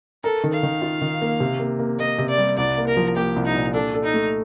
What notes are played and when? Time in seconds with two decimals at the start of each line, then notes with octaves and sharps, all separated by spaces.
0.23 A4 A#4
0.44 D#3
0.53 F5
0.63 D#3
0.82 F4
1.01 D#3
1.22 A#3
1.40 C3
1.60 A#3
1.79 A#3
1.99 A#3 D#5
2.18 C3
2.29 D5
2.38 G3
2.57 C2 D5
2.78 A#3
2.87 A#4
2.97 F3
3.17 A#3 G4
3.36 C2
3.45 D#4
3.55 A#2
3.74 D4 A4
3.94 A4
4.04 D#4
4.14 A3